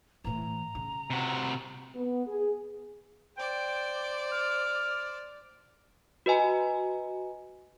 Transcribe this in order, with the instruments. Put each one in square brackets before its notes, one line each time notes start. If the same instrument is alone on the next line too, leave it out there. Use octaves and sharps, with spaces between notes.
[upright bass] A2 E3 [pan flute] A#5
[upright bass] C#3
[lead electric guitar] C3 F#4
[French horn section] B3
G#4
[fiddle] C5 D5 [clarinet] G5
[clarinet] F6
[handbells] F#4 B4 D#5 G#5 A#5